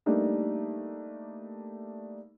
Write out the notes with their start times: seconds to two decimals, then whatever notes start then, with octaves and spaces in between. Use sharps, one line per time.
0.06 G3 A3 A#3 D4 D#4